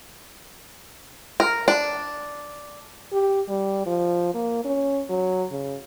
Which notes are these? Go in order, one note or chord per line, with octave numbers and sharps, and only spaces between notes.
A#4
D4
G4
G3
F3
A#3
C#4
F#3
C#3